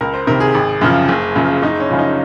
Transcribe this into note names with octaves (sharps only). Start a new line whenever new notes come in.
C#2 A#4
C5
C3 D#3 A#4
G#4
G#1
F#2 C#3 F3
F#1
F#2 C#3 F3
F#1 D#4
C#4
F#2 C#3 F3
D#4